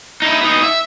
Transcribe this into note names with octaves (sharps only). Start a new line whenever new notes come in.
D#4 E4
B3 D#4
E5